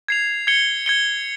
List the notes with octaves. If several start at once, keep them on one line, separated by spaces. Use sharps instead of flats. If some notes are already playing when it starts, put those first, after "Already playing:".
G#6 C7 F7
G#6 C#7 G7
G#6 C#7 G7